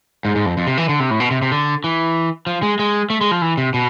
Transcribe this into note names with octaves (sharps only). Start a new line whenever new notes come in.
G#2
G#2
F2
F2
C3
E3
D3
C3
A2
B2
C3
C3
D3
E3
F3
G#3
G#3
A3
G#3
F3
E3
C3
B2